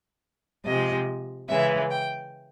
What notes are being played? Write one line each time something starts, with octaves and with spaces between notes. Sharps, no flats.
C3 F3 G#3 D#5
C#3 E3 G#3 E5
G5